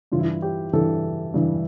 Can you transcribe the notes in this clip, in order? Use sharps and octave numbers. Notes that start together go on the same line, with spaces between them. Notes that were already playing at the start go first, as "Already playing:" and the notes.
G2 E3 F4
E4
F4
G4
G2 E3 A4
G2 E3